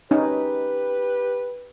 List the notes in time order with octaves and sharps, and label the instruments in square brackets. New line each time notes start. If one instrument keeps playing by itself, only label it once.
[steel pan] C#4 D#4 [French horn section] G4 B4